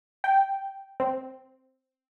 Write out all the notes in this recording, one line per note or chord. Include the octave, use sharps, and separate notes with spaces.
G5
C4